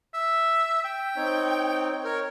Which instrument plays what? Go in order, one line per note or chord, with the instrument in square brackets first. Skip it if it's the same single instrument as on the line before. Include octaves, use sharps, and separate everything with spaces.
[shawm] E5
G5
[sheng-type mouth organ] C4 D#4 C#5
A#4 C#5